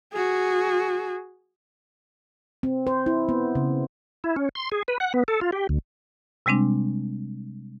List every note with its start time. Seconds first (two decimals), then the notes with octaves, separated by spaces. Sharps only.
0.13 F#4 G#4
2.63 C4
2.87 C5
3.06 E4
3.29 B3
3.55 C#3
4.24 E4
4.36 C#4
4.55 C6
4.72 G#4
4.88 B4
5.00 F#5
5.14 B3
5.28 A4
5.41 F4
5.52 G4
5.69 D2
6.46 C3 G3 G#3 C4 D4